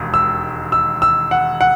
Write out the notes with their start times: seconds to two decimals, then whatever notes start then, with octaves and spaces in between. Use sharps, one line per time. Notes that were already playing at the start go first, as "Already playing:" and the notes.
Already playing: E1 D#2 G#3
0.14 E6
0.72 E6
1.02 E6
1.31 F#5
1.61 F#5